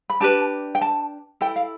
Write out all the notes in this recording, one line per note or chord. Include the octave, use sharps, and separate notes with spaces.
B5
D4 G4 B4 A5
G5
A5
E4 A4 G5
F5